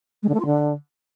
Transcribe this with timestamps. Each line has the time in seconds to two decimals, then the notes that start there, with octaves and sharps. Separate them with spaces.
0.22 G#3
0.28 D3
0.34 A3
0.39 F4
0.45 D3